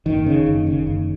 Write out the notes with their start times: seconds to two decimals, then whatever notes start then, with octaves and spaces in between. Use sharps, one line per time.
0.06 F#1 D#3
0.26 C#3
0.46 F#1
0.67 C#3
0.87 F#1